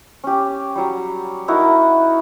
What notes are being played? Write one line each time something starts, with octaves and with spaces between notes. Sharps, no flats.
C#4 G4
F#3 G3
D#4 E4 F#4 A#4